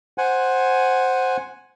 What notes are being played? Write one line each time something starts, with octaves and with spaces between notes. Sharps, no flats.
C5 F#5 G#5